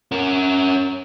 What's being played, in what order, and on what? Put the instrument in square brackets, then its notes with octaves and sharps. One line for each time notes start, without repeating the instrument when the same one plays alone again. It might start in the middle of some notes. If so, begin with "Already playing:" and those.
[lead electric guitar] C#4 A#4